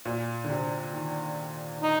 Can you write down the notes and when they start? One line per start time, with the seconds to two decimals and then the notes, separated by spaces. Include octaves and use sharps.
0.05 A#2
0.44 D3
0.50 C3
0.93 D#3
1.82 D#4